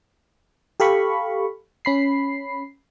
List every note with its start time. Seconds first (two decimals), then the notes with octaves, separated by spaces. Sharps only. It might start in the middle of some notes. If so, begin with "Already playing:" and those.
0.80 G4 A4 F5 B5 C#6
1.85 C#4 B5 C7